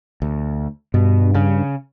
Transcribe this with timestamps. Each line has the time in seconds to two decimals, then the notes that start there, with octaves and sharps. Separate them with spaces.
0.22 D2
0.94 G2 B2
1.34 C#3